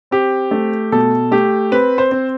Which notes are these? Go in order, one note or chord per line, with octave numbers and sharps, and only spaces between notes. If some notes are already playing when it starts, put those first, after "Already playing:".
C4 G4
A3
B2 A4
A3 G4
C4 B4
C5
C4